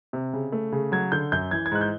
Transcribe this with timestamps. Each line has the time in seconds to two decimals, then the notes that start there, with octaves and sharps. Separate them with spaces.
0.13 C3
0.33 C#3
0.52 A3
0.72 C#3
0.92 F#3 G#6
1.12 D3 G6
1.32 F#2 G6
1.51 E3 G#6
1.66 G#6
1.72 G#2 F#6
1.81 G6